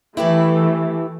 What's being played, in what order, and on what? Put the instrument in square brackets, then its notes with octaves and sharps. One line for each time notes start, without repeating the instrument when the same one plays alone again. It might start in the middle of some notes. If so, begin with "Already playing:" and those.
[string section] E3 A3 [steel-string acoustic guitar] E4 G4 B4